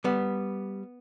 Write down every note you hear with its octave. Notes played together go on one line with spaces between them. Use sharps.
G3 B3